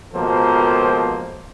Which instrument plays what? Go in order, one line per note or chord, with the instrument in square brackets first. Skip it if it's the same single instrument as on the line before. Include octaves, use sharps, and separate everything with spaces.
[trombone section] C#2 B2 F3 A#3 A4 C5